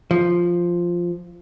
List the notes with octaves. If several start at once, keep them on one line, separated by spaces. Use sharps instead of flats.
F3